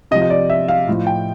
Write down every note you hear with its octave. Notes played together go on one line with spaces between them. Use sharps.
C3 F3 D#5
D#5
D5
E5
F5
A2 F3
G5